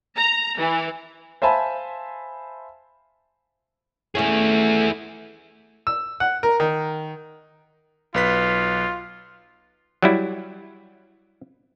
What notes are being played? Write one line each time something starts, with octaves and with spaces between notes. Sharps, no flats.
A#5
E3
C5 E5 F5 G#5 A5 B5
A3 C#4 E4 G#4
E6
F#5
A#4
D#3
B1 F4 B4 B6
F#3 G3 E4